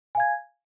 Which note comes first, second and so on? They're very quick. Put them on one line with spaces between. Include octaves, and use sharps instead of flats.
G#5 F5 G#6